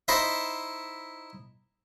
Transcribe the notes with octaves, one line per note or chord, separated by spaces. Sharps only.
D#4 E4 C5 D#5 E5